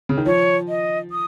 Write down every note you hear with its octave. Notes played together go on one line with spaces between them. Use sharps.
C#3
D#3
F3 C#5
D#5
D#6